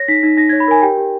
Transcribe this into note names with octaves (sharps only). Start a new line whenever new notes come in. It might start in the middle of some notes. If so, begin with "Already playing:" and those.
Already playing: C#5 A#6
D#4 B6
D#4
D#4 A#6
C#5 G#6
B5
A#4 G#5
G4 G5
G4